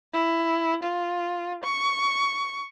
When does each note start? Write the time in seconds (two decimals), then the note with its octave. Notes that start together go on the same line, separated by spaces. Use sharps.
0.13 E4
0.83 F4
1.64 C#6